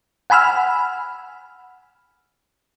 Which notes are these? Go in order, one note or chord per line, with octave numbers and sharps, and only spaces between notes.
F#5 G#5 B5 E6 F6